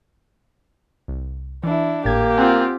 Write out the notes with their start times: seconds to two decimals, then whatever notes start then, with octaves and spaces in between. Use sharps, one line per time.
1.08 C2
1.64 E3 D4 E4
2.05 G#1 A2 A#3 G4 G#6
2.38 C4 F4 F#5 G#5 F#6